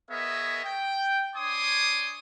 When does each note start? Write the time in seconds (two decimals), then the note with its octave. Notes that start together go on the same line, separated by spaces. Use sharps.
0.10 B3 G#4 A#4 C#5 D#5 E5
0.65 G5
1.36 D4 C#5 G#5 C6 D6 D#6